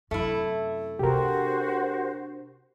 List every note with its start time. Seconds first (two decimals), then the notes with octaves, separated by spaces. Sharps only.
0.11 F#2 C3 A3 E4
0.99 C3 D4 F#4 G4 A#4 C5